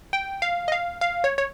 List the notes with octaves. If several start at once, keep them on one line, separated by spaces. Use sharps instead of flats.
G5
F5
D#5
F5
F5
C#5
C#5